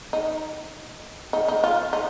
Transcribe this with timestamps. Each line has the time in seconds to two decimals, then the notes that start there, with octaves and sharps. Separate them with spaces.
0.13 D#4
1.33 D#4
1.48 D#4
1.64 F4
1.93 D#4